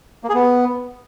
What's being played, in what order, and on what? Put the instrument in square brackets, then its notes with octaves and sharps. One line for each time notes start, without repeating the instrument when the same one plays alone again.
[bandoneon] A#3
G#4
B3